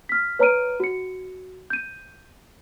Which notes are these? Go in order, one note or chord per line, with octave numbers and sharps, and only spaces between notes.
F6 B6
B4 C#5 A#5 F6 D7 D#7
F#4 C#7
G6 D#7